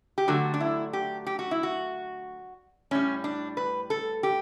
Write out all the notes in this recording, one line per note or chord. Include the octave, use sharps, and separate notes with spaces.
G4
D3 F#3 A3 F#4
D4
E4
G4
G4
F#4
E4
F#4
A2 G3 C#4
D4
B4
A4
G4